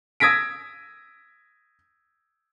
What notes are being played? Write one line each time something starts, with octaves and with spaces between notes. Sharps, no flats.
D#6 E6 G#6 A#6 B6 D7